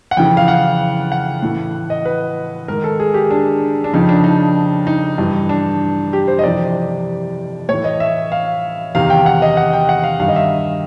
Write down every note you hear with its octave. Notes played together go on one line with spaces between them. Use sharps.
F#5
F2 C#3 E3 G5
F5
F#5
F#5
A2 E3
D#5
B4
G#2 D#3 A#4
A4
G#4
G4
D4
D4
F2 C#3 F3 D#4
D4
D#4
D#4
G2 E3
D4
G4
C5
D#5
F2 C3 E3 D5
A2 C#5
E3
D#5
E5
F5
E2 C3 D#3 F5
G5
F#5
D#5
F#5
G5
F#5
F5
G2 D#3 F5
D#5
E5